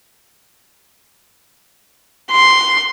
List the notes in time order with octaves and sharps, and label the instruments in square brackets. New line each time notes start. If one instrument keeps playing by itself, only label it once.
[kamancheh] C6